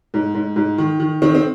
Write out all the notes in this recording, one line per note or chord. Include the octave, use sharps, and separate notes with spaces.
G#2
G#2
G#2
D#3
D#3
D#3 C4
C4